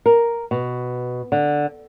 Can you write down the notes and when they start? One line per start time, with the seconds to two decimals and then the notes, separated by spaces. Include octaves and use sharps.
0.06 A#4
0.51 B2
1.32 D3